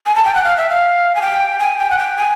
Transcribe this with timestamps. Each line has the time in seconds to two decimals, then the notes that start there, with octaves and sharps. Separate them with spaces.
0.06 G#5
0.15 A5
0.25 G5
0.35 F#5
0.44 F5
0.57 E5
0.70 F5
1.15 G#5
1.22 G5
1.59 G#5
1.79 G5
1.90 F#5
1.98 G5
2.17 G#5